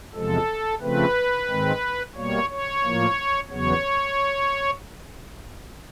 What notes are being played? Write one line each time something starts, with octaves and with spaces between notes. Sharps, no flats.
E2 C3 F3 G#3 A4
C#3 F3 A3 C4 B4
G#2 D#3 G#3 C4
B2 G3 A#3 C#5
C#5
A2 F3 A#3
E2 C#3 F#3 B3 C#5